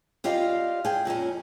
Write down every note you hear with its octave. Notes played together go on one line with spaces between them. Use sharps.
F4 G4 D5 D#5 F5
G#4 G5
F2 A#2 C#4 G#5